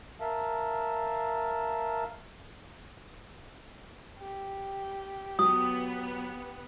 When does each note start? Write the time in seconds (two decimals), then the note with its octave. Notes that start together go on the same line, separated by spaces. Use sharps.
0.20 A#4 E5 F5 A5
4.18 G4
5.39 F#3 B3 D#6